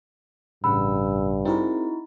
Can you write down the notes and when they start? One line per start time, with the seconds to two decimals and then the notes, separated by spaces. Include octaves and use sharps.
0.64 A1 G2 C#3 F#5 B5 E6
1.45 C4 D#4 E4 F#4 G#4 A#4